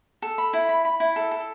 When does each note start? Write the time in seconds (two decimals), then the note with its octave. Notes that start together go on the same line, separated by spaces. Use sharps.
0.22 A4
0.38 B5
0.53 E4
0.69 B5
0.85 B5
1.00 E4
1.16 A4
1.31 A4